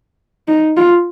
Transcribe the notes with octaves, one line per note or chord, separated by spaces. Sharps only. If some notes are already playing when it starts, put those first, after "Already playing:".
D#4
F4